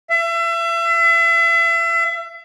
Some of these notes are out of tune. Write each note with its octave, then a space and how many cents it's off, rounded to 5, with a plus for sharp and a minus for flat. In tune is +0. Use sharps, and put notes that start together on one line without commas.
E5 +35